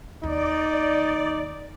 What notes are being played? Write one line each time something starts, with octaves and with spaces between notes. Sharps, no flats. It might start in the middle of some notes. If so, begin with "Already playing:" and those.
D#2 D#4 D5